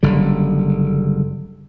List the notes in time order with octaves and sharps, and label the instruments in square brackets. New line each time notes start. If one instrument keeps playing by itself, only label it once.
[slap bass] F#1 D3 G3